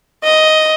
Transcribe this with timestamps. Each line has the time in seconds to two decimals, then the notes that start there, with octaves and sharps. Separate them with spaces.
0.23 D#5